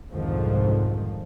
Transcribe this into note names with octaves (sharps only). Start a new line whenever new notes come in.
C2 F2 G#2 D3 D#3 F3